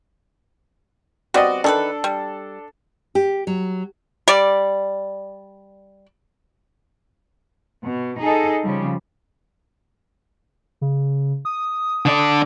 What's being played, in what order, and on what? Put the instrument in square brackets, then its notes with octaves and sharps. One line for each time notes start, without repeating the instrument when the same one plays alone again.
[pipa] G3 B3 C4 [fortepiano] F#4 D5 D#5
[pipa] D#3 G#4 B4 [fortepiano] D4 A4
[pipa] G3
[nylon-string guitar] G4
F#3
[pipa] G3 D5
[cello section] B2
D#4 G#4 A4 D#5
C#3 F3 G3
[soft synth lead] C#3
D#6
[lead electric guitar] D3 D5